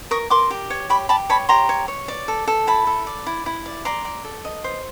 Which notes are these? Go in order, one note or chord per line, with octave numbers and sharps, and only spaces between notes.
A#4 C#6 D#6
A#4 C6 D6
G4
C#5
G4 B5 C#6
G4 A5 B5
C#5 A5 B5
G4 A#5 C6
C#5
C#5
D5
A4
A4
E4 A5 B5
A4
D5
E4
E4
D5
D5 A#5 C6
D5
A4
D#5
C5